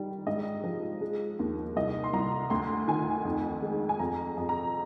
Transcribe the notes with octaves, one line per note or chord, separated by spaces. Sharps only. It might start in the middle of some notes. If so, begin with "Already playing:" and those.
Already playing: D#3 G3
G#2 D#5
F3
G#3
D#2
C2 D#5
C6
C2 A#5
D2 C6
D#3 G#5
F2
G#3
G#5
F2 A#5
F2
A#5